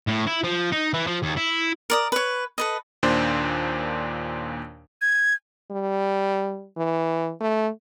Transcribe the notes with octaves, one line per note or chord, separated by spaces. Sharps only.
A2
E4
F3
D#4
E3
F3
D#2
E4
A#4 D5 D#6
B4 C#5
A4 B4 D#5
D#2 A#2 D4 C5 D5
G#6
G3
E3
A3